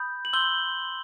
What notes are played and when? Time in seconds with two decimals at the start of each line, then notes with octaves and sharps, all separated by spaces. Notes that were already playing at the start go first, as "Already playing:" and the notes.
Already playing: B5 D#6 G6
0.25 F#7
0.33 C6 E6 G6 G7